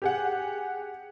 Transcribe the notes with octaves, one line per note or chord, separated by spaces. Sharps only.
G4 G#4 F#5